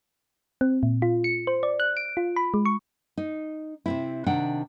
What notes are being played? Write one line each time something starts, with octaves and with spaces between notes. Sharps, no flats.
C4
A#2
F4
C#7
C5
D5
F#6
D7
F4
B5
G#3
C#6
D#4
C3 C4 E4
C3 D#3 D4 F#5 G5